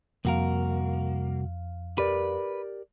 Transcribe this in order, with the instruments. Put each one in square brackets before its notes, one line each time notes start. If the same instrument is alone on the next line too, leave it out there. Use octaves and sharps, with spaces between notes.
[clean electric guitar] C2 F#4 A#4 [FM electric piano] F2 F5 [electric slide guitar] A#3
[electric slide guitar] G4 A#4 D5 [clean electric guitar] B4